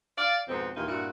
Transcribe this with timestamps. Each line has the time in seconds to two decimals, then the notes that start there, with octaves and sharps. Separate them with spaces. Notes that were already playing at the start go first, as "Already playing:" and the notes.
0.18 D5 F5
0.49 F2 G#2 B2 B3 C4
0.76 D#2 A#2 D#3 E3 D#4 F4
0.88 G2 A#2 E4 F#4